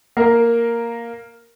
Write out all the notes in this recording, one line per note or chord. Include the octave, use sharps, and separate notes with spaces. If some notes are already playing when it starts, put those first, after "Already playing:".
A#3 A#4